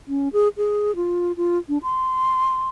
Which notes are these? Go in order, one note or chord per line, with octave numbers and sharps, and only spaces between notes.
C#4
G#4
G#4
F4
F4
D4
C6